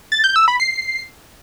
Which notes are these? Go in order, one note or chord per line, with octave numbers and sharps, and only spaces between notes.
A6
G6
E6
B5
C7